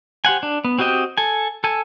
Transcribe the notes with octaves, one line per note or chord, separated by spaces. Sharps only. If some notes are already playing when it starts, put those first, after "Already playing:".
G4 C5 F#5 G#5
D4
B3
C4 F#4 G4 D#5 G5
A4 G#5
A4 G#5